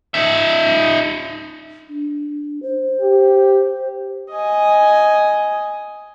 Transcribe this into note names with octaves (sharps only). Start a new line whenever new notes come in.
D#4 E5
D4
C5
G4
D#5 G#5